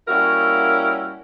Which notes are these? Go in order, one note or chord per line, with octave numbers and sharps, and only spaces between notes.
G3 A#3 C#4 E4 F#4 A#4